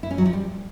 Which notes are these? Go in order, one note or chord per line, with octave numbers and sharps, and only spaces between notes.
E4
C#4
F#3
F3
G3